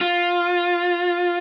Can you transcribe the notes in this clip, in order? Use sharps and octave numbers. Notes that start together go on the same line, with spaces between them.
F4